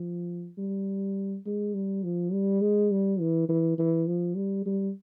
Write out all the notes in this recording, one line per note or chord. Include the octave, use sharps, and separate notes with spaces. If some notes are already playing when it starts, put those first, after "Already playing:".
Already playing: F3
G3
G#3
G3
F3
G3
G#3
G3
E3
E3
E3
F3
G3
G3